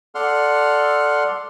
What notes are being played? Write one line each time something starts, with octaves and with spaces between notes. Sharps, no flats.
A4 D5 F#5 C6 F6